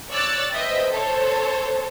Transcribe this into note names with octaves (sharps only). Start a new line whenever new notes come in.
C#5 D5 E6 F#6 A6
B4 C5 D#5 E5 G5
A4 C5 C#5